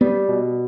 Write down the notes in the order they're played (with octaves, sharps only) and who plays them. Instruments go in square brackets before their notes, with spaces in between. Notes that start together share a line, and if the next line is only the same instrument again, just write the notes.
[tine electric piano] G3 [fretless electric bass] B3
[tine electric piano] B2